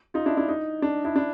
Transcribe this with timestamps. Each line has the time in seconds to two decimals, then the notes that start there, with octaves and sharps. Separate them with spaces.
0.14 D#4 F4
0.26 D4 E4
0.37 D4 E4
0.49 D#4
0.82 D4
1.05 D4 E4
1.16 D4 E4